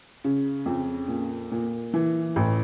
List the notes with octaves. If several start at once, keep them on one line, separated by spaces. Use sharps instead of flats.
C#3
F2
A#2
A#2
E3
A1